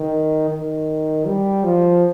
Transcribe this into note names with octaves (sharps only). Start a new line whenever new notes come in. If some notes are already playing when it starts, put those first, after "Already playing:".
Already playing: D#3
D#3
G3
F3